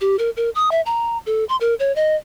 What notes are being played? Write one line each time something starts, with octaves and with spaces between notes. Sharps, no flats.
G4
A#4
A#4
D#6
E5
A#5
A4
C6
A#4
C#5
D#5